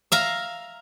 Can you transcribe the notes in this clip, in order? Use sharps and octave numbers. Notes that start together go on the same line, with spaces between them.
E5 F5 A#5